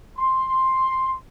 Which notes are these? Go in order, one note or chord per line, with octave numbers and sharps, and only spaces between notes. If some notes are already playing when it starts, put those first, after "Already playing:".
C6